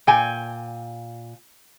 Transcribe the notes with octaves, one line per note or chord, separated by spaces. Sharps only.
A#2 G5 G#5